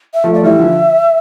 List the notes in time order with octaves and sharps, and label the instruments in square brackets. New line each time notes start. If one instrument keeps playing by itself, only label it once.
[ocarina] E5
[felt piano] F3 A3
[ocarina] D5
[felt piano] E3 G3 [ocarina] E5
[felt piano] D3 F3